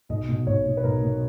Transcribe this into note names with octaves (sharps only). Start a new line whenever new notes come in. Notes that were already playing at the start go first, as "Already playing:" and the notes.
B1 D#5
B2
B1 C#5
B2
B4
B1 A#4
B2